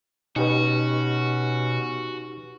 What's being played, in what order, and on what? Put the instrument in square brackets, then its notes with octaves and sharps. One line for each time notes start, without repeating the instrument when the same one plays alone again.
[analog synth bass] B2 [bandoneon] C#4 [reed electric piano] D#4 G4 B4 [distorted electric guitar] F#4